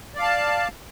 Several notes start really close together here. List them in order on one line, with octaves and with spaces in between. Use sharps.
D5 F5 A5